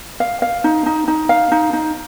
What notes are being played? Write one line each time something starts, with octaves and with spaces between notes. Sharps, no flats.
F5
F5
D#4
D#4
D#4
F5
D#4
D#4